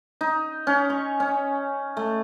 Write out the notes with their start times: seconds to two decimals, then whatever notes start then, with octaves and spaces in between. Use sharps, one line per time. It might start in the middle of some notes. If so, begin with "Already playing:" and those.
0.21 D#4
0.67 C#4
0.90 C#6
1.20 C#4
1.97 A3